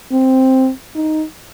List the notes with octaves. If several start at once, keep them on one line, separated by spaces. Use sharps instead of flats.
C4
D#4